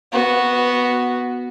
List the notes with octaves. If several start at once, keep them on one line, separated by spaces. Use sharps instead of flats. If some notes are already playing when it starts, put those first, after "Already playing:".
B3 F#4